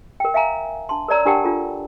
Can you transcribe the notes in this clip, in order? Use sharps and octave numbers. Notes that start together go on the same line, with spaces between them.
A#4 G5
E5 F5 G#5 A#5
D4 A5 C6
A#4 C#5 D5 A#5 E6
D4 G4 A#4 F#5 G5 A5
D4 F4 A4 A#5